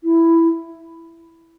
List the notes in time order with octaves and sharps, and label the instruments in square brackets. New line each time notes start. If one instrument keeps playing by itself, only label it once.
[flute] E4